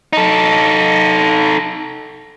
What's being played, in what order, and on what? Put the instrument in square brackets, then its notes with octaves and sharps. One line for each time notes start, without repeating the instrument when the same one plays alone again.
[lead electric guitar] D#4 A4